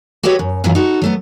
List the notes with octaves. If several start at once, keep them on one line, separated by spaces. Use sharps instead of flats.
F#4 G4 A4 B4 C#5 D#5
F#2
F#2 A2 E3 F#3 E4 F4
D#4 F#4 A4
F#3 A3 B3